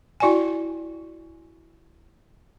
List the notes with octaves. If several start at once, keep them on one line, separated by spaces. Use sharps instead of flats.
E4 F#4 D5 G5 G#5